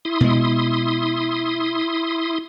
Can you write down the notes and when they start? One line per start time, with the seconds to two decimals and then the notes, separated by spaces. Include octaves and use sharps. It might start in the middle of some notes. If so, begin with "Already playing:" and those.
0.05 E4 C6 D#6
0.21 B2 G#3